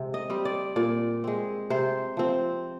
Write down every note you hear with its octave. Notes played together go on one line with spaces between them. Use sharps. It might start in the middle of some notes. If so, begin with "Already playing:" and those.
Already playing: C3 G#3 C4
D#5
G3 C4
D5
A#2 D5
G#3 C4
C3 C5
F3 C4